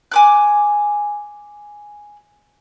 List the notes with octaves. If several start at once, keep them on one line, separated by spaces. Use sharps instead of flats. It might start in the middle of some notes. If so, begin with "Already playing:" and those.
G#5 D6 F#6